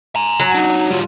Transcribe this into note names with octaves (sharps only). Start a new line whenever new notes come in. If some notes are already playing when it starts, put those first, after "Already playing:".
G#5 A#5
F#3
D4 D#4
G3 F4